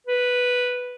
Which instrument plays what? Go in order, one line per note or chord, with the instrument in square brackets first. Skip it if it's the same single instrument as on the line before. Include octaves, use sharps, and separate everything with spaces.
[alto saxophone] B4